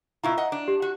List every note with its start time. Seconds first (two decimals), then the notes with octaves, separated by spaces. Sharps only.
0.24 B2 E4 F4 A#5 C#6
0.38 D#5 F#5
0.52 D4
0.68 G4
0.82 F#4